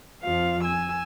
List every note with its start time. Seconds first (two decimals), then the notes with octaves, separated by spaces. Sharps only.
0.22 F2 F3 F5
0.62 G#5 E6